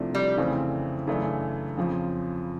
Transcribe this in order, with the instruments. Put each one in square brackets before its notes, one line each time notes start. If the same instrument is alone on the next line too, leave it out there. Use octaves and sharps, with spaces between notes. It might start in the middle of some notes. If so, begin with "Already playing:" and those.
Already playing: [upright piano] C2 C3 F3 A3 D4
[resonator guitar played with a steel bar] G3
[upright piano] F2 C#3 E3 A3 C4
F#2 C#3 E3 A3 D4
F2 C#3 F3